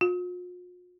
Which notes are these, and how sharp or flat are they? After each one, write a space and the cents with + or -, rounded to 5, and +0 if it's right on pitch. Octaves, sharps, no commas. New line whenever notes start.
F4 +45